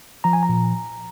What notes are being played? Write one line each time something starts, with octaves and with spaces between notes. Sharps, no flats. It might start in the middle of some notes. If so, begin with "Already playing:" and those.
F3 A#5
G#5
A#5
A#2